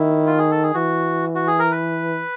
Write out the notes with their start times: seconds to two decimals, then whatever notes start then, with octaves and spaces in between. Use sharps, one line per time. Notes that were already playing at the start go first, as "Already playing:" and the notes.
Already playing: D#3 E4
0.26 F4
0.38 G#4
0.51 A4
0.63 G#4
0.74 E3 F#4
1.35 F#4
1.47 G#4
1.59 A#4
1.71 B4